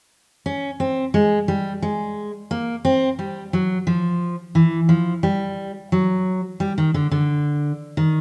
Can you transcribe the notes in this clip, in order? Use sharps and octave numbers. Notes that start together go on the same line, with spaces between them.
C#4
C4
G#3
G3
G#3
A#3
C4
G3
F#3
F3
E3
F3
G3
F#3
G3
D#3
D3
D3
D#3